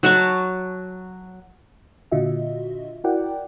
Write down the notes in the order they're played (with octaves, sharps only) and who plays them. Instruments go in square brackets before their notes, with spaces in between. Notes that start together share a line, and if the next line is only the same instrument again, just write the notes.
[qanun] F#3 F#5 A5 C#6
[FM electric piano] A#2 D3 F4 F#4 D#5 E5
E4 F#4 A#4 D5 F#5 G5